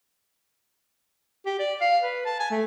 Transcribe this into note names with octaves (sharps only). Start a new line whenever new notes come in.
G4
D5
F5
B4
A5
G#5
A3